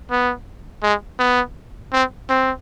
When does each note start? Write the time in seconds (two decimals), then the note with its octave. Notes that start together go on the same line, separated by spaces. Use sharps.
0.11 B3
0.83 G#3
1.19 B3
1.93 C4
2.30 C4